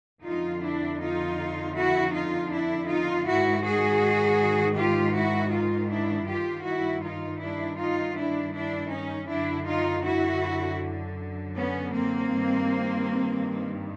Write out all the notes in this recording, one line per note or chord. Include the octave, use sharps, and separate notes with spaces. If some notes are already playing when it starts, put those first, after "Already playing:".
F2 D3 D#4 F4
D4 E4
D#4 F4
E4 F#4
D#4 F4
D4 E4
D#4 F4
G#2 D#3 E4 F#4
F#4 G#4
F4 G4
E4 F#4
D#4 F4
D4 E4
G2 D#3 F4 G4
E4 F#4
D#4 F4
D4 E4
D#4 F4
D4 E4
D4 E4
C#4 D#4
F#2 D3 D4 E4
D#4 F4
E4 F#4
B3 C#4
A#3 C4
G2 D#3